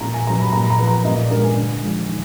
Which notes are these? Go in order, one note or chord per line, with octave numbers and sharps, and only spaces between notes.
A#2 A#5
G#5
F#3 B3 A#5
B5
A#2 A#5
B5
A#5
F3 B3
A#5
A#2 D#5
D5
G#3 B3 D4 A#4
G#5
D3
F3 G#3
D#3